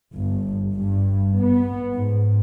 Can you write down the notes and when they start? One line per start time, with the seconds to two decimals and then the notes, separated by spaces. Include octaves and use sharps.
0.14 G1
0.75 G2
1.40 B3
1.94 G#2